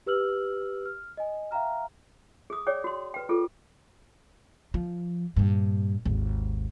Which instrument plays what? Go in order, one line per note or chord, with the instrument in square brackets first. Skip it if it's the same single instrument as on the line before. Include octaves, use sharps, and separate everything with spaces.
[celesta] G4 B4 E6 F6 F#7
F6
D#5 G#5
E5 F5 G5 A#5 F6
[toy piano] G#4 D#6
G#4 C#5 D5 G5
F#4 C6
B4 G5
F4 G#4 A4
[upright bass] F3
G2 A#2
G#1 D#2